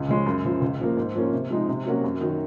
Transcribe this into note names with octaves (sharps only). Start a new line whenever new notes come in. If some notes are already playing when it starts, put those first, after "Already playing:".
Already playing: C#2
C#3 F3 G#3 C#4
F#2
C#3 F3
C#2
C#3 F3 A#3
G#2
F3 A#3 C#4
C3
F3 G#3 D#4
C3
F#3 A#3 C#4 F#4
F#2
D#3 F#3